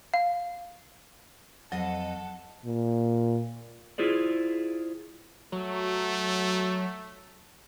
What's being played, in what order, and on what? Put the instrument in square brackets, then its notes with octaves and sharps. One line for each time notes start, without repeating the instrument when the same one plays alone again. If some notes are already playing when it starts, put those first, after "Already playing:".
[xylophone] F5
[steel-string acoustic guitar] F2 D#5 [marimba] F#3 [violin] A4 A5 [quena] F#5
[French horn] A#2
[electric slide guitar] E4 F4 G#4 C5 D5
[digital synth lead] F#3 [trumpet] A3